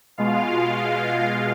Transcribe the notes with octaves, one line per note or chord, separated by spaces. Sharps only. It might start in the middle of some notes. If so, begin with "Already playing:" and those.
B2 G#3 F4 F5
F4 F5